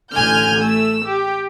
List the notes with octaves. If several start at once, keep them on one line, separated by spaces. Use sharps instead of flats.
A1 D3 G#5 F6 G6
A3 E6
G4